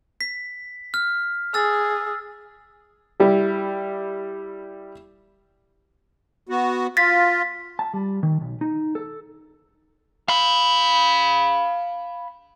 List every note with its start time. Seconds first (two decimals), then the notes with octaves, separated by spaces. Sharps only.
0.21 B6
0.94 F6
1.54 G#4 E6 A6
3.20 G3 E4 G4
6.49 B3 F#4
6.97 F4 A6 B6
7.79 A5
7.94 G3
8.23 D#3
8.41 B1
8.61 D#4
8.95 A4
10.28 F5 B5